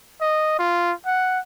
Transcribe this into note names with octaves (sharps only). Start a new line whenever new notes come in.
D#5
F4
F#5